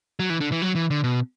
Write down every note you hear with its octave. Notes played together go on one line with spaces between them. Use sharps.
F#3
E3
D3
E3
F#3
E3
D3
B2